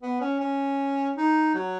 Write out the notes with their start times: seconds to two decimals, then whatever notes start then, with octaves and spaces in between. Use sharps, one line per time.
0.02 B3
0.20 C#4
0.40 C#4
1.16 D#4
1.54 F#3